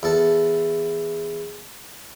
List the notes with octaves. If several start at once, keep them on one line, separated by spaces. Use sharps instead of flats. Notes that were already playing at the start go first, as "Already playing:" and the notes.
E2 A4